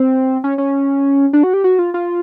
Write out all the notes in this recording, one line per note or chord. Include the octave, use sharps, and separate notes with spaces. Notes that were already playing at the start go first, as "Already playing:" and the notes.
Already playing: C4
C#4
C#4
D4
F#4
G4
F#4
F4
F4